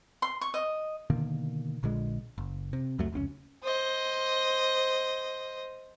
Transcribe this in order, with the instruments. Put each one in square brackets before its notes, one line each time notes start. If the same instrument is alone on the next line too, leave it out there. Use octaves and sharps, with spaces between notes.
[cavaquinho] C6
C#6
D#5
[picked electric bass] B2 D3 D#3 A#3
A#1 A#2 D3 G#3
F#1
C3
C#2 F#2 F#3 A3
F1 C#2 C4 C#4
[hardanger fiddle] C5 D#5